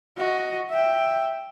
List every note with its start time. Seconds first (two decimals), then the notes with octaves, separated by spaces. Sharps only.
0.17 F#4 D#5
0.70 E5 G5